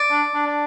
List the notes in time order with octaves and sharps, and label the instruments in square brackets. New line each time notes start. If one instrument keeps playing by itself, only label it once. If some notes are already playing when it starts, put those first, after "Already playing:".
Already playing: [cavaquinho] D5
[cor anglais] D4
D4
D4